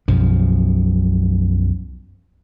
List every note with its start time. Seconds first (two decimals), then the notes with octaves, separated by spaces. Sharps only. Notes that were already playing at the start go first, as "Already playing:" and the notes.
0.08 B1 F#2 F3